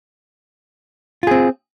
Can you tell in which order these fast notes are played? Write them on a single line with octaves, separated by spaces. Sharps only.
F4 G#4 C4